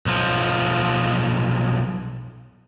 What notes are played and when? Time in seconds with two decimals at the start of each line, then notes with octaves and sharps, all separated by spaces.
0.06 B1 F3